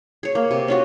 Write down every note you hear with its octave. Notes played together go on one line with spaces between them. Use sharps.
G#4 C#5
A#3
C3
C#4 F4 F#4